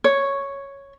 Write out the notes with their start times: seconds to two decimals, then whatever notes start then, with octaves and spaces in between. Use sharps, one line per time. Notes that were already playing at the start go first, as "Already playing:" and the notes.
0.04 C#5